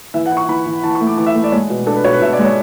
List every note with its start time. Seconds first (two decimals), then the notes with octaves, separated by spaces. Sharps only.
0.14 E3 E5
0.26 F#5
0.31 E4
0.37 C#6
0.49 E3 B5
0.66 E3
0.83 E3 A5
0.95 C#6
1.01 A3
1.07 D6
1.18 E3 D6
1.26 E5
1.35 A3
1.44 D5
1.52 G#3 C#5
1.70 B2 B4
1.86 D4 A4
1.96 B4
2.04 B2 C#5
2.13 B4
2.21 B2 E5
2.33 D5
2.39 G#3
2.45 C#5